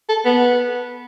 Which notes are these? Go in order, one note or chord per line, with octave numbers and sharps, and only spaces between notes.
A4
B3